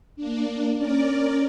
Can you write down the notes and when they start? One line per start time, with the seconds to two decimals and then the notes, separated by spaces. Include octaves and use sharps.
0.16 A#3 D4
0.77 C#4 A#4 D5